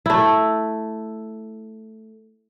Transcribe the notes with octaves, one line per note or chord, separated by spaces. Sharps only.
A3 E4